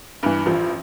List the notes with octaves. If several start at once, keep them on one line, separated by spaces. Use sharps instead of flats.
G2 E3
A1 F3